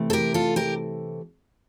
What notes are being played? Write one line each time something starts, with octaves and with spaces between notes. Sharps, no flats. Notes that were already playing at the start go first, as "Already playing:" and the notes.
Already playing: C3 E3 A3
A4
G4 A#4
F4 A4
G4 A#4